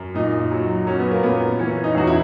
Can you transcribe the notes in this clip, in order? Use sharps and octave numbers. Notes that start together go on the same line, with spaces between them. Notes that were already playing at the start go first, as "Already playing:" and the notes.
Already playing: F#2
A#2 D#4
F#3
F#3 C#4
B3
A#3
A#2 B3
E3 C#4
D#4
E2 F#4
E4